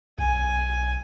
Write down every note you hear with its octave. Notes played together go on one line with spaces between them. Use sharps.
B1 G#5